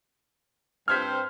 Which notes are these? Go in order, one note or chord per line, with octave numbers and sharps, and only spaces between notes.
G2 C4 C5 F6 G#6 B6